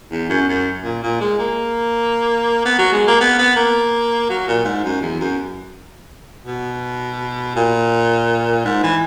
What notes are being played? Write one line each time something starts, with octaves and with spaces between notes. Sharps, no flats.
E2
F#2
F#2
A#2
A#2
G#3
A#3
B3
F#3
G#3
A#3
B3
B3
A#3
F#3
A#2
G#2
F#2
E2
F#2
B2
A#2
G#2
E3